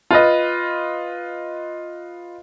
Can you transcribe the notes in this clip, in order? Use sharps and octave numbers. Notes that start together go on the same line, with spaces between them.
F4 B4 D#5